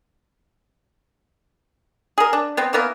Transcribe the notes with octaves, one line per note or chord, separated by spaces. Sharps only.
G#4 A#4
D4
B3 C4
E3 A#3 B3 A#4